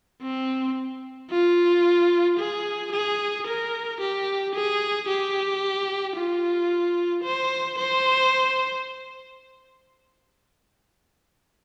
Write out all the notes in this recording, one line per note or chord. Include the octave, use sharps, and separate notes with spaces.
C4
F4
G#4
G#4
A#4
G4
G#4
G4
F4
C5
C5